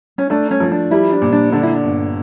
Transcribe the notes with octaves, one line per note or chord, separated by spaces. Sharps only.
C#4
A3 D4
C#4
F3
D4
G3 E4
D4
A#2
D4
D3 D4
E4
D4
G1